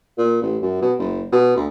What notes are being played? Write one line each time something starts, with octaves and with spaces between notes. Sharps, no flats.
A#2
A1
F#2
B2
F#1
B2
D2